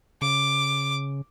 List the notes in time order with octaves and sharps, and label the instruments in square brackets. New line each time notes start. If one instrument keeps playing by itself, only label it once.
[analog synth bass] C#3 [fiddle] D6